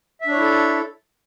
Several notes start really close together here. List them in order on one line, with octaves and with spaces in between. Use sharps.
E5 D4 C#5 E4 A4